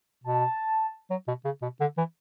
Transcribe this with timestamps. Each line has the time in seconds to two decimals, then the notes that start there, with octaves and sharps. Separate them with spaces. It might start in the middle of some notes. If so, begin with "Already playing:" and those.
0.24 B2 A5
1.11 F#3
1.28 B2
1.45 C#3
1.62 B2
1.80 D3
1.98 E3